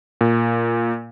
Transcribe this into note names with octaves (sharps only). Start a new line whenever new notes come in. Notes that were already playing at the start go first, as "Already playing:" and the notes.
A#2